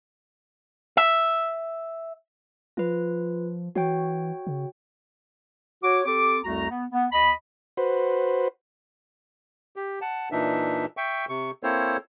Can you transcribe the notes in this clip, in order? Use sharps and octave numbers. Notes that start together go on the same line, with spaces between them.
E5
F3 F4 B4
E3 F#4 C#5 G5
C#3
F#4 C#5 D6
C4 G4 A4 D6
C2 F2 A3 F#4 A#5
B3
B3
D#2 D#5 B5
F#4 B4 C5
G4
F#5 A5
A#2 E3 D4 D#4 E5
E5 G5 C#6
C3 C#6
A#3 C4 E4 A4 C5 C#5